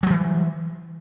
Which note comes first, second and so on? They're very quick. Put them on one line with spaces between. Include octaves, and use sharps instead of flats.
F#3 G3 E3